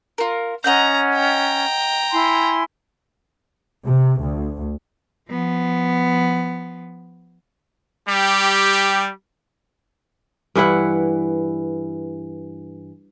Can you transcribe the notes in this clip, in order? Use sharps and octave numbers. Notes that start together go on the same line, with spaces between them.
F4 A#4
C#4 D#5 F#5 A#5 G6
G5 A#5
E4 G#5 C6
C3
D2
F3 B3
G3 G4
G2 E3 E4 F#5